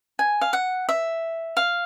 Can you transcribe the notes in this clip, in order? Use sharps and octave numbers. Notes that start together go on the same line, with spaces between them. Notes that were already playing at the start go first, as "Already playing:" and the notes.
G#5
F5
F#5
E5
F5